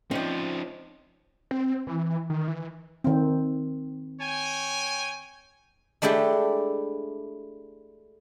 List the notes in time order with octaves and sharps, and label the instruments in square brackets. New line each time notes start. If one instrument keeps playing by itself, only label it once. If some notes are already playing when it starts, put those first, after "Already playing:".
[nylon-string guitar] F3 C4 [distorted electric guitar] C#4 D#4
[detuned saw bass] C4
E3
D#3
E3
[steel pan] D#3 C4
[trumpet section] C#5 G5 G#5
[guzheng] G#3 A3 D4 E4 G4